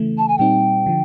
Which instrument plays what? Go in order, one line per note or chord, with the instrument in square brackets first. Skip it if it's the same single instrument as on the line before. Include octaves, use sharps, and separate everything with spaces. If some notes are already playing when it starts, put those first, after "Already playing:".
Already playing: [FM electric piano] C#3 E3 A3
[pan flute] A5
G#5
[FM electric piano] A#2 G3 C4 D#4 [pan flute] G5
[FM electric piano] D3 F3